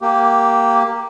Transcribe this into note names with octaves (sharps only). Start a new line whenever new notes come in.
A#3 G4